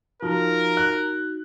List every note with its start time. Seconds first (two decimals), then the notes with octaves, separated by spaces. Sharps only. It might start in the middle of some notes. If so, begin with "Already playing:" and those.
0.22 F3 D#4 F#4 A#4
0.77 F#6